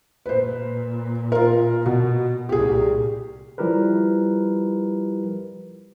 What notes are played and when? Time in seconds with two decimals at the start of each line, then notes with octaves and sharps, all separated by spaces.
0.26 A#2 B4 C5
1.32 F4 A#4
1.86 B2
2.49 C2 A#2 G4 G#4
3.58 F3 G3 E4 G4 A#4 B4